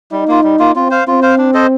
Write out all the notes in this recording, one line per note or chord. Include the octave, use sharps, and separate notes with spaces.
G3 D#4
A#3 F4
G3
A#3 F4
C4 F4
C5 F5
C4 F4
C5 F5
D4
A4 C5 D#5